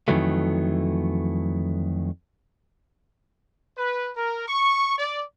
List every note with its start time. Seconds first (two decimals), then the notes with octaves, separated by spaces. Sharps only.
0.08 F2 A#2 D#3 E3 F#3 A3
3.78 B4
4.17 A#4
4.48 C#6
4.98 D5